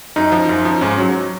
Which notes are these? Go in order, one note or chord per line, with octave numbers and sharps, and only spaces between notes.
F#2 D#4
F3
F#2
F3
G#2 C#4
F#3